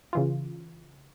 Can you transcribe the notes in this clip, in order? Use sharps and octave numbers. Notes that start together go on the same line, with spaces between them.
C#3 E3 F4